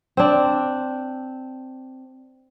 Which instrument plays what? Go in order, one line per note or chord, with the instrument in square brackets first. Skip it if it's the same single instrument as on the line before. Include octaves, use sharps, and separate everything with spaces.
[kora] C4 D4